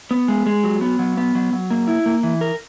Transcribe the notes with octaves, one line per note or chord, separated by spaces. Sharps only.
B3
G#3
G#3
F#3
B3
F#3
B3
F#3
F#3
A#3
E4
A#3
E3
A#4